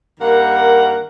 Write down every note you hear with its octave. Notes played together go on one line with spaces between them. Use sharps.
G2 D#3 A#3 A#4 F#5